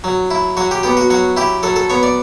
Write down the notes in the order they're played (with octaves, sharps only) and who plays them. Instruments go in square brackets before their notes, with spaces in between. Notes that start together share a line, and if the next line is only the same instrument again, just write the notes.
[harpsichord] F#3
E4
F#3 F#4
G4
B3 G4
F#4
F#3 F#4
E4 G4
F#3 A4
A4
B3 C#5
D5